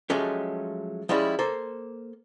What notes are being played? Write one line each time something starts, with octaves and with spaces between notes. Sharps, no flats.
F3 F#3 G#3 A3 C#4 G4
F3 G3 G#3 C#4 E4
A#3 A4 C5